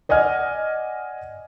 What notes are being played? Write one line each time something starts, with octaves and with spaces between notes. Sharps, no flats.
D5 D#5 F#5 G#5 F6